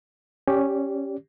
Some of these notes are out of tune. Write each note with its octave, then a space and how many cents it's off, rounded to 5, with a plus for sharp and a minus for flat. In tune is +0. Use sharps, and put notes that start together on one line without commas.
C#4 -5 G4 +0 D5 -25